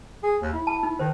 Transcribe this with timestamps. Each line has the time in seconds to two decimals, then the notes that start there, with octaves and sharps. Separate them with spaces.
0.23 G#4
0.41 D#2
0.53 E4
0.67 A5
0.83 D#4
0.99 D#3 C5